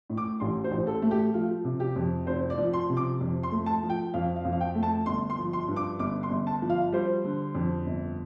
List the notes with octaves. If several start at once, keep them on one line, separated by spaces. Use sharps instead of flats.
A2
D6
A1 C6
C5
A1
A4
A3
G4
F3 F4
C3
G4
F2
F1 C5
D5
F3
C6
C3
D6
F2
C6
A3
A5
F3
G5
F2 F5
F5
F2
F5
G5
A3
A5
G1 C6
C6
F3
C6
G2
D6
G1 D6
C6
G1
A5
F3
F5
G3 C5
D3
F2
G1